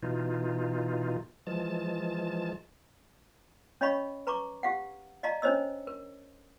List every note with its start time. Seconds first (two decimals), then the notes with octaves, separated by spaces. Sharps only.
0.03 B2 E3 D#4 F4
1.47 E3 F3 G#3 A5
3.81 C#4 C#5 D#5 F5 B5 C#6
4.27 B4 A#5 C#6 D6
4.63 G4 F5 F#5
5.23 D5 D#5 F5 A5 A#5
5.42 C#4 D4 C5 C#5 D#5 E6
5.87 A#4